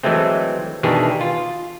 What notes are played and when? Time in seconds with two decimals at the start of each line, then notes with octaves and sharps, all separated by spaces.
0.03 E3 F#3 G#3 A3 C4
0.83 B2 D#3 E3 D4 G4 G#4
1.21 F4